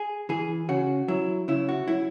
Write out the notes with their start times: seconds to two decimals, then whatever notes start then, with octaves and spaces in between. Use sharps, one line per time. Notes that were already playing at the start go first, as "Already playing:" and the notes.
Already playing: G#4
0.29 E3 G#4
0.69 C#3 F#4
1.08 F#3 E4
1.48 C#3 E4
1.69 F#4
1.88 F#3 E4